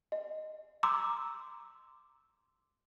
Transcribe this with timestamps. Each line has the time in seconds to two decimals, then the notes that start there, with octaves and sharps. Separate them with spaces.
0.12 D#5
0.83 A#5 C6 D6 E6